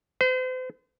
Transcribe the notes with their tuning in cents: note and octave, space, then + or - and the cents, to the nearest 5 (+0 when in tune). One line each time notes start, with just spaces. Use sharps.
C5 -40